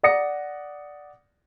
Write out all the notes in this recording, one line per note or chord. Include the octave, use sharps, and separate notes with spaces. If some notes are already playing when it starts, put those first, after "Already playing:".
D5 F#5 D#6 A#6 C#7